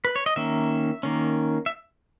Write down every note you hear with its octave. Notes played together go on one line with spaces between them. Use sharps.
B4
C#5
D#5
D#3 A#3 C#4 E5
D#3 A#3 C#4
E5